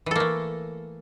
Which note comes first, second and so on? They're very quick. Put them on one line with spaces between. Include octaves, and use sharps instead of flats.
E3 A4 A#3 A3